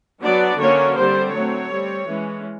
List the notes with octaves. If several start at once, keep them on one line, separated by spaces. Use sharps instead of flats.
F#3 B3 D4 D5
D3 F#3 A#3 C#4 C#5
D3 G3 C4 C5
F#3 A3 C4 C#5
G3 C4
E3 G#3 C#4